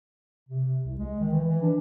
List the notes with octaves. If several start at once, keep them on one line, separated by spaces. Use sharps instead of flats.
C3
C2
G#3
D#3
E3
E3
D4